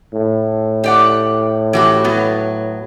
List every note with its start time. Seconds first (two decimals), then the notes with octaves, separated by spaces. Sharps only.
0.14 A2
0.84 G4 D5 F#5
1.73 E3 F#4 G4
2.04 F#3 B3